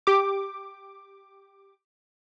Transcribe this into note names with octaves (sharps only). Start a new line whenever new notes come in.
G4 D6